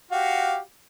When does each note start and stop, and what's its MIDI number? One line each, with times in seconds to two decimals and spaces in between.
0.11 0.58 66
0.11 0.58 67
0.11 0.58 77